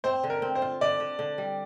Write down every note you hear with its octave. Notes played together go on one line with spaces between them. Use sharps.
C4 C5
D3
A#4
C4
C5
F4
D3 D5
D3
D3
G3